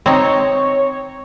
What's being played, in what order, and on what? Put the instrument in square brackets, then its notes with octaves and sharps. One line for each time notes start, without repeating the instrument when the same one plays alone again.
[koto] C4 D#4 [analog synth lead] C#5